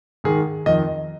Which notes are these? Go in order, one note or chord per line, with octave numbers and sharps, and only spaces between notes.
G#2 D#3 G#4
F2 D#3 D#5